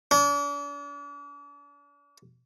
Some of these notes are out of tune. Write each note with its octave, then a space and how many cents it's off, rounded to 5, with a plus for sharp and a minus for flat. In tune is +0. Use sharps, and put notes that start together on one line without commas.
D4 -40